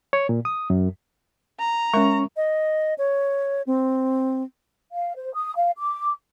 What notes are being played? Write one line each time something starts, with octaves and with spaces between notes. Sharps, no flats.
C#5
A#2
D#6
F#2
A#5
G#3 C#4 A#4 E5 C#6
D#5
C#5
C4
F5
C5
D#6
F5
D6